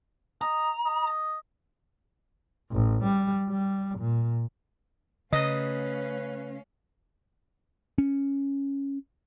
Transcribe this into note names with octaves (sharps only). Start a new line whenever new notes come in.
D#5 A#5
D#5
A1
G3
G3
A#2
C#3 A3 C#4 B4 D#5 F5
C#4